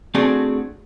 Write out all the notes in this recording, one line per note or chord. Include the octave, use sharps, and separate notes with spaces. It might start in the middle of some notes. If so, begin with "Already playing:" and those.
A3 C4 D4 F#4 G#4 D5